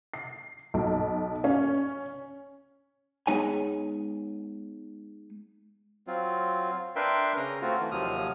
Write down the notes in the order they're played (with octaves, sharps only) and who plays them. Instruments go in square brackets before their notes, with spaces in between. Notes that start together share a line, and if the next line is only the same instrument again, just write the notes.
[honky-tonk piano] C7
B1
C#4
[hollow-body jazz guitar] G#3 B3 D#4 C#5 G#5
[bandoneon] F#3 C4 F4
D4 A#4 B4 E5 G5 C6
C#3 C#4 A#5
A3 C4 F4 F#4
E3 A3
D#2 C3 F3 F#3 D#6 F6